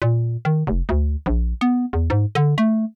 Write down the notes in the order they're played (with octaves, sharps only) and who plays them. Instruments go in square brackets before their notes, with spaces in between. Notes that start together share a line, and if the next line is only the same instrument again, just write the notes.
[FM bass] A#2
D#3
F1
D2
A#1
B3
E2
G#2
D3
A3